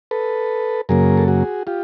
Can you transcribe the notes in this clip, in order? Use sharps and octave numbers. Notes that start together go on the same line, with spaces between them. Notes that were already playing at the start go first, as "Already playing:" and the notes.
A4 B4
F#2 C#3 F#3 A#3 G#4 A#4
A4
F#4 G#4
F4 G4